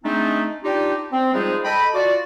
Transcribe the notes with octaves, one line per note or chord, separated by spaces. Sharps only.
G#3 A3 C4 D4 D#4
D4 D#4 F4 G4
C4
F3 G3 G#3 D#4 G#4 C5
A4 D#5 G5 B5
F4 F#4 D5